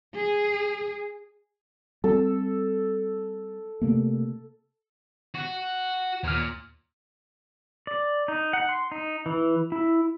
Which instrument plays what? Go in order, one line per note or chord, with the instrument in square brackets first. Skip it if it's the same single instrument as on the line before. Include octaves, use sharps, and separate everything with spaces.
[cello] G#4
[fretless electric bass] G3 C4 [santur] A4
[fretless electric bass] C3 A3 A#3
[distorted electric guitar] F#4
[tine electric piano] D#2 F6 [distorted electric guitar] A#2
[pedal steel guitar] D5
D#4
F#5
C6
D#4
E3
E4